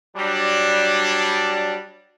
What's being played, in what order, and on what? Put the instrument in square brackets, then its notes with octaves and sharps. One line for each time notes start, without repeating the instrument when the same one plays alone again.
[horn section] F#3 G3 D4